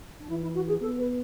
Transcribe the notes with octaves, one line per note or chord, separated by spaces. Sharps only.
D4
E3 E4
E4
F#4
G#4
B3 A4
B4